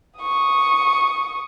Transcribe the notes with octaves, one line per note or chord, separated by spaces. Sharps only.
C#6 D#6